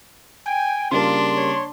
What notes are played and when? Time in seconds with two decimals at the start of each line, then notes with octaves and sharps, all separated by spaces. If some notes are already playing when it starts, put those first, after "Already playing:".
0.46 G5 G#5
0.91 C#3 G3 A#3 D4 F4 C6
1.37 C#5